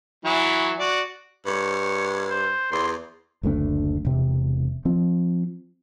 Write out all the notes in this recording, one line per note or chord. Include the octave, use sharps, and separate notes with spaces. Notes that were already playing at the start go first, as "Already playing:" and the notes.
E3 F#3 E4
F#4 D5
G2 C#5
C5
E2 C6
F#1 D2 A3 D4
E1 C3
F3 C4